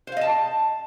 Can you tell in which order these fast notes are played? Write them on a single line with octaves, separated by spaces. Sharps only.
C5 F5 D#5 A5